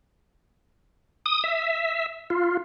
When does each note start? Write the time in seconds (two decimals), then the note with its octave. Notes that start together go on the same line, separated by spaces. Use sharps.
1.26 D#6
1.44 E5
2.30 F4